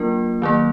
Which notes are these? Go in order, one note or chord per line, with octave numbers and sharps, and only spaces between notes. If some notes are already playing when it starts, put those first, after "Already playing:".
Already playing: F#3 A#3 D4 F4 A#4
D#3 F#3 A#3